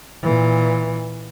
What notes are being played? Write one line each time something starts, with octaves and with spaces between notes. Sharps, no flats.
A#2 E3